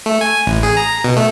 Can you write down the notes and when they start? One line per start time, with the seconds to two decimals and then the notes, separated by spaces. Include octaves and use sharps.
0.06 A3
0.21 G#5
0.47 A1
0.63 G#4
0.77 A#5
1.04 B2
1.17 A3